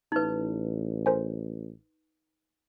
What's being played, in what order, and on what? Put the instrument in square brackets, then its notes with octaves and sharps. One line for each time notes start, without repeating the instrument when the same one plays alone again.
[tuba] A1 [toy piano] D#4 B4
[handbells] A#4 C5 G#5